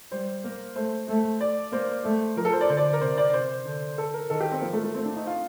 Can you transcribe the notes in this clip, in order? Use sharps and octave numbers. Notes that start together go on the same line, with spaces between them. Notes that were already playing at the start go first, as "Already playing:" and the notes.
G3 C5
A#3
A3 C5
A3
D5
A#3 C5
A3
F3 A#4
A4
C5
D5
D3 C5
D5
A#4
C3 C5
D5
C3 C5
D3
A4
A#4
D#3 A4
G4
C4
F3 A#3
A3
A3
A3 C4
D4
D#4
F4